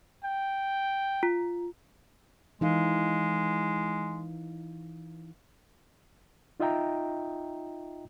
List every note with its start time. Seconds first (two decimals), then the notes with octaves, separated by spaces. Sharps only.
0.24 G5
1.23 F4
2.61 E3 G#3 D#4 F5
6.60 D#4 F4 D#5 E5 G5 A#5